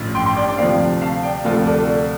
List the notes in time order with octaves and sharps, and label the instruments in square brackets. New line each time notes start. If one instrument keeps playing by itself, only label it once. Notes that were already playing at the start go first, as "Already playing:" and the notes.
Already playing: [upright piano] A1 G2 F3
G5 C6
G5 C6
D5 G5
D5 G5
D2 C3 F3 C5 F5
F5 A5
D5 G5
D2 C3 F3 F4 A4
A4 D5